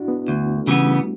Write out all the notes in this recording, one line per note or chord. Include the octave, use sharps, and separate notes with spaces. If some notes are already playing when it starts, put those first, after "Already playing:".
Already playing: D4 E4 F#4
B3
D2
A3
C#3 E3 G3 B3